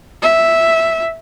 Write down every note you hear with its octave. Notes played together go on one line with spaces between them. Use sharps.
E5